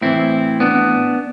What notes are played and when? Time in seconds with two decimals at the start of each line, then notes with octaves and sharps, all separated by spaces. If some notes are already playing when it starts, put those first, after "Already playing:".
0.01 A2 E3 C4 E4
0.60 B3 D4